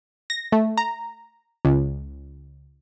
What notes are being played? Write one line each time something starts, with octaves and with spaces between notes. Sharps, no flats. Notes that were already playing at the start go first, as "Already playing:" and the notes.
A#6
A3
A#5
C#2